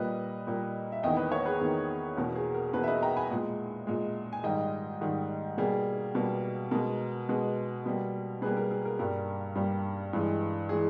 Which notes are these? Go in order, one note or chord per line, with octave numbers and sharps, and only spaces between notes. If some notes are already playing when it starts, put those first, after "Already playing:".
Already playing: A#2 G3 A#3 B4 D#5
A#2 G3 A#3
E5
E2 D#3 A#3 D#5 G5
B4 D#5
A#4 C#5
G#4 B4
E2 D#3 A#3
E2 B2 A#3 A#4
G#4
A#4
E2 B2 A#3 G#4 B4
E5
B4 D#5
G5 A#5
G#5 B5
A#2 G#3
A#2 G#3
G#5
G#2 D#3 G3 D#5 G5
G#2 D#3 G3
B2 G3 A#3 G#4
B2 G3 A#3
B2 G#3 A#4
B2 G#3
B2 G3 A#3
B2 G3 A#3 G#4 B4
A#4
G#4
A#4
G2 G3 A#3 A#4
G2 G3 A#3
G2 E3 G#3
E3 G#3 G#4